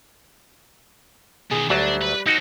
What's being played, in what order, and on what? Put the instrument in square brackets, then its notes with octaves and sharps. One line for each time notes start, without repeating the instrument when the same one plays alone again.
[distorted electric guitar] B2 D#3 [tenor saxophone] G#4
[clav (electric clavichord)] D2 F#3 [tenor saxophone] G3 [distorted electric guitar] D4
[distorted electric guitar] B4
[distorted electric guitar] C4 A4 [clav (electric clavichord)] D#4 F#4